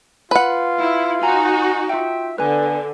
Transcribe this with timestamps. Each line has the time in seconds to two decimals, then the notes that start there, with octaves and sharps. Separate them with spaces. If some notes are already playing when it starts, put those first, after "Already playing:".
0.31 F4 B4 F#5
0.82 E4
1.23 D#4 F#4 G#5 A#5
1.89 F4 E5 G5
2.38 D3 B3 B4 G#5